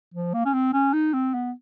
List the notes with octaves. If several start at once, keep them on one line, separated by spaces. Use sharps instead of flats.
F3
A#3
C#4
C4
C#4
D#4
C4
B3